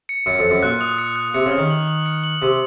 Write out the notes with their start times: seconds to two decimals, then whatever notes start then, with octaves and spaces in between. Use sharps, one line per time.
0.09 C#7
0.26 F#2 C#7
0.39 F2
0.45 C#7
0.50 F#2
0.62 A#2 F#6
0.81 D#6
0.98 C#7
1.16 F#6
1.34 C3 C#7
1.46 C#3
1.51 F6
1.57 D#3
1.70 F#7
1.88 F#7
2.06 C#7
2.24 F#7
2.42 C3 F#7